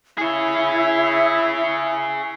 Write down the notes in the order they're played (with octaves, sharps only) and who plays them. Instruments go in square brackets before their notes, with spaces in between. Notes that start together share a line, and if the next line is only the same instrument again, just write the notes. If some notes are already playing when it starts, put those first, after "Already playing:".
[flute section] E4 [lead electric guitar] G#4 C#5